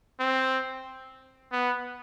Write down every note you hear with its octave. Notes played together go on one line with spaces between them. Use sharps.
C4
B3